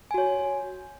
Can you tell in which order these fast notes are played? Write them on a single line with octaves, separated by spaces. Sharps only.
G#5 F#4 C#5